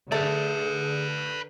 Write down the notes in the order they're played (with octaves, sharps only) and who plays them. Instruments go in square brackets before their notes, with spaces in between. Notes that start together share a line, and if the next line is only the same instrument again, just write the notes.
[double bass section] D3 [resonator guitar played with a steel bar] A3 [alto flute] G#4 [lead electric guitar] B4 D5